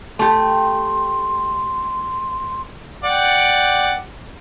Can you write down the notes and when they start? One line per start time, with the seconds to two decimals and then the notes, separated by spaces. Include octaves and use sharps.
0.19 A3 G4 C6
3.04 D5 F#5 G5